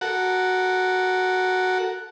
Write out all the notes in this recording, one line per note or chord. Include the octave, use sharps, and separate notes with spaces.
F#4 A4 A#4 F#5